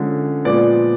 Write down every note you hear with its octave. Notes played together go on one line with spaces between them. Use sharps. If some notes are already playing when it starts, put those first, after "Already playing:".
Already playing: D3 F3 G#3 C#4
A#2 F3 G#3 B3 D5